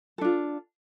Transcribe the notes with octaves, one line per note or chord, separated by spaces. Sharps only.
D4 F4 A4